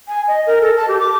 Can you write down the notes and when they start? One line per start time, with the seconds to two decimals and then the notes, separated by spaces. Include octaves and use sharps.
0.08 G#5
0.28 D#5
0.47 A#4
0.61 A4
0.77 A5
0.88 G4
0.99 D6